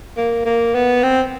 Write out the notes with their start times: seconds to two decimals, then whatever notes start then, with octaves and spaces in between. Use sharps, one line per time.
0.17 A#3
0.45 A#3
0.75 B3
1.03 C4